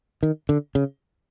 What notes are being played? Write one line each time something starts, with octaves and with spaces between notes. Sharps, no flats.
D#3
D3
C#3